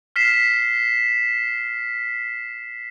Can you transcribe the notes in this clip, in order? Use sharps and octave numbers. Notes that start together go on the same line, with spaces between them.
F6 B6 C7 E7